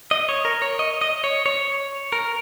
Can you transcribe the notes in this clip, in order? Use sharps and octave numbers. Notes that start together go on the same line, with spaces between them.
D#5
C#5
A#4
C#5
D#5
D#5
C#5
C#5
A#4